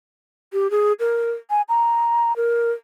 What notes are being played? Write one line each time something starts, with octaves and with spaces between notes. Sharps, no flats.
G4
G#4
A#4
G#5
A#5
A#4